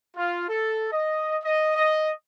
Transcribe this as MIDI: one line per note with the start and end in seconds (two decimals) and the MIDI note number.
0.16 0.47 65
0.49 0.88 69
0.92 1.36 75
1.44 1.72 75
1.77 2.11 75